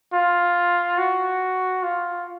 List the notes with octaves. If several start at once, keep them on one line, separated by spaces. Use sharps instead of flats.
F4
F#4
F4